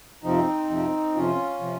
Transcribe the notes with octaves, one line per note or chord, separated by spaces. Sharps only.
F2 C3 F3 C4 D#4
F2 C3 F3
F2 C3 F3 C#4 F4
C3 F3